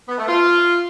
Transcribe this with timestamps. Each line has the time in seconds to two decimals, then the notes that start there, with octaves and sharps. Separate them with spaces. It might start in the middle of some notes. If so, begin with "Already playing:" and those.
0.08 B3
0.18 A3
0.28 F4